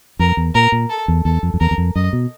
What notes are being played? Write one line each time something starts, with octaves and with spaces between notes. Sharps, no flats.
F2 A#4
E2
A#2 A#4
A#2
A4
E2
E2 A4
F2
F2
E2 A#4
E2
F2
F#2 D#5
B2